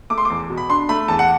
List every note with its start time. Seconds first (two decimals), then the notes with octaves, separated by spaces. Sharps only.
0.10 A3 D6
0.18 C6
0.25 E2 D6
0.50 B2
0.57 B5
0.69 D4 C6
0.89 A3 B5
1.08 E2 A5
1.19 F#5